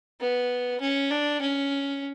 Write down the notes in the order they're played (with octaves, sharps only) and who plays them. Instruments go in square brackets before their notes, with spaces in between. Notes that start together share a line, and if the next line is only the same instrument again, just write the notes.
[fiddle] B3
C#4
D4
C#4